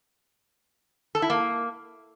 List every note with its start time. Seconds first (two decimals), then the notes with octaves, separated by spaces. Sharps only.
1.15 A4
1.22 E4
1.30 A#3